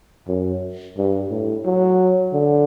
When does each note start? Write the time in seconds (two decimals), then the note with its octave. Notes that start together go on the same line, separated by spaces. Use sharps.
0.28 F#2
0.97 G2
1.31 A2
1.66 F#3
2.34 D3